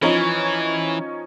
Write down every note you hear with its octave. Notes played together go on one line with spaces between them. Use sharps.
E3 F3 C#4 D#4